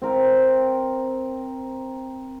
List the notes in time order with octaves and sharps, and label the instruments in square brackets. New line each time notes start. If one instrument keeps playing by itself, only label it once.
[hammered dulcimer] C4 A#4 G5